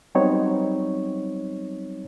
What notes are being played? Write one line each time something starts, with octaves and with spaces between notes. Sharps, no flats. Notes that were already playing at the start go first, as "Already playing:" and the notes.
F#3 G3 B3 C4 D#4 C#5